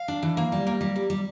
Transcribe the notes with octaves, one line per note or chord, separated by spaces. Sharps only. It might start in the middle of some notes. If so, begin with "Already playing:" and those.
Already playing: F5
D4
E3
A#3
G3
A#3
G3
G3
G3